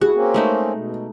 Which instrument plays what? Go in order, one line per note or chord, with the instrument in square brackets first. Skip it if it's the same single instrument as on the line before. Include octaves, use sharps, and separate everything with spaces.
[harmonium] A3 E4 [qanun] F#4 [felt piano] G#4
[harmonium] A#3 C4 C#4
[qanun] G#3 A3 D#4
[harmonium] B2